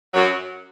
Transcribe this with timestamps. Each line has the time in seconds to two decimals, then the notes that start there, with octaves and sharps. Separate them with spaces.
0.14 F#2 F#3